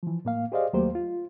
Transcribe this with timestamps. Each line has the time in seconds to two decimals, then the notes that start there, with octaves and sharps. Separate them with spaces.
0.03 E3 F3
0.25 A2 A#3 F5
0.52 G4 G#4 C5 D5 D#5 F5
0.73 D#2 F#3 A3 A#3 G4 C5
0.95 F4